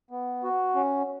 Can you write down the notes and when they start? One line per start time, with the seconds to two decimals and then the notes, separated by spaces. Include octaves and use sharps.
0.11 B3
0.44 F#4
0.75 C#4